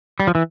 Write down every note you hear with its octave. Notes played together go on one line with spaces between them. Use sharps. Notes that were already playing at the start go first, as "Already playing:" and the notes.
G3
F3
E3